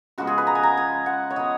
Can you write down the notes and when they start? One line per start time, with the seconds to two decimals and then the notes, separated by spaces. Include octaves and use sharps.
0.18 C#3 F3 G#3 B3 F#4
0.27 G#4
0.38 B4
0.47 A#5
0.55 G#5
0.63 A#5
0.77 G#5
1.06 F#5
1.30 C#5
1.36 F3 B3 D#5